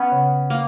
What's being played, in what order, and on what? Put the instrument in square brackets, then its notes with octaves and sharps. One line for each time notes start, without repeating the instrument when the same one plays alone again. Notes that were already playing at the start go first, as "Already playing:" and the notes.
Already playing: [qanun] B3 C#4
[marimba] C#3
[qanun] A#3